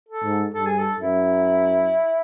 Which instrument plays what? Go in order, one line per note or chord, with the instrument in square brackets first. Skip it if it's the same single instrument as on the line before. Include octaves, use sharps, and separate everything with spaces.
[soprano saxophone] A4
[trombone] G#2
[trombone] G2 [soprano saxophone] A4
[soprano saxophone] G#4
A4
[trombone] F#2 [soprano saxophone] E4